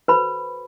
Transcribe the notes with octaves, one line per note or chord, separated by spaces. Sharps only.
F#4 A4 B4 C5 B5